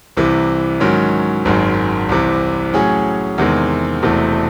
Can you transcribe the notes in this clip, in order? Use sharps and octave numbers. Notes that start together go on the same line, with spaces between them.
C2 C3 E3
G#2 D#3 F#3 C#4
G#1 F#2 D#3 G#3
C2 C3 E3
A2 F#3 C#4 G#4
E2 C3 D#3 G#3
E1 E2 C3 E3 A3